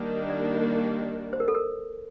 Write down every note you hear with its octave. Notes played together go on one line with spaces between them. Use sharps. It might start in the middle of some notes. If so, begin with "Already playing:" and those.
Already playing: D#3 G3 A#3 D4
D5
C5
A#4
A4
A#4